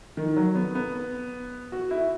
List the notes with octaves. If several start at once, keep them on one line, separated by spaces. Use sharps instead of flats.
D#3
F#3
B3
B3
F#4
E4